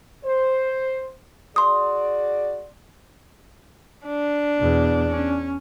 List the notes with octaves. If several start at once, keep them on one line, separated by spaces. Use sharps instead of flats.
C5
F#4 G#4 D5 C6 D#6
D4
E2 B2
C#4